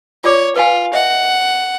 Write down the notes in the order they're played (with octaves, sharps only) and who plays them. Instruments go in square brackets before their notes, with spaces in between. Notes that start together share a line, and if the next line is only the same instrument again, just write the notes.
[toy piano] F4 D5 D6 [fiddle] C#5
[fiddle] F4 [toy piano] B4 F5 G#5
[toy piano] D#5 E5 [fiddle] F#5